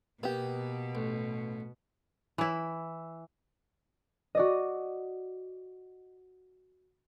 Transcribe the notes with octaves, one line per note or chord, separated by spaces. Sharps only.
B2 A#3 B3 G4
A1
E3 E4
F#4 D5 D#5